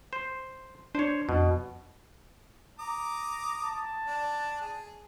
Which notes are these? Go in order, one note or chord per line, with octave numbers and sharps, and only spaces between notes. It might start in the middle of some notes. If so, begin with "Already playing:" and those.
C5
D4 C5 C#5
F2 B2
A#5 D6 D#6
A5
D4
G#4